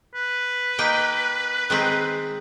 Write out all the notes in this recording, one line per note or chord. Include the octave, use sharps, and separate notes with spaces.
B4
A#3 D#4 G5
D#3 G#3 C4